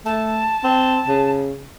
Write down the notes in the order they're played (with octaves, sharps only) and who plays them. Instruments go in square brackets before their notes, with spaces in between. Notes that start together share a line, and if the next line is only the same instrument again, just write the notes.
[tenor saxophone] A3 [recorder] A5
[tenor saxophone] C4
C#3